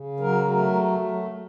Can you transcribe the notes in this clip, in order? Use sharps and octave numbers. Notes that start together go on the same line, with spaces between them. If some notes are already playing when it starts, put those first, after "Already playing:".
Already playing: C#3
F#3 A#4
A3 A#4